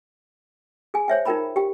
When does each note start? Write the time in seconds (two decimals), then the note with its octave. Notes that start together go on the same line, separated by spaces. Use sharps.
0.94 G#4 G#5
1.08 C5 C#5 E5 G5
1.25 D#4 F4 A#4 G5 A#5 B5
1.56 G4 G5